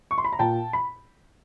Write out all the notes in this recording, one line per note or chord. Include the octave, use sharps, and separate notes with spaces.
C#6
C6
B5
A#5
A#2 G5 A5
B5